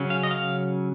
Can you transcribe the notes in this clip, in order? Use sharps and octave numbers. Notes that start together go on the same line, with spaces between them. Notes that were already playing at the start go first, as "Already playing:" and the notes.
Already playing: C#3 F#3 C#4
F5
D#5
F5